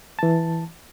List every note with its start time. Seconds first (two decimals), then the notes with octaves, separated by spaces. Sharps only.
0.19 E3 A5